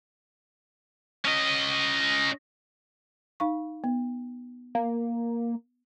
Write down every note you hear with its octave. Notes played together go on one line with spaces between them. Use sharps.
C#4 D#5
D#4 F5 C#6
B3
A#3